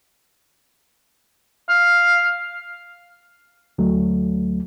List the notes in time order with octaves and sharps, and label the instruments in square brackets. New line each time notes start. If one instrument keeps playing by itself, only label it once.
[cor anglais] F5
[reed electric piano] D2 F#3 A3